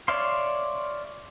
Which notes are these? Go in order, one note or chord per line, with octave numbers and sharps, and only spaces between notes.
C#5 D5 E5 F5 C6